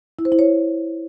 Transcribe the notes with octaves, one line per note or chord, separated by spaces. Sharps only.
E4
C5
E4
C#5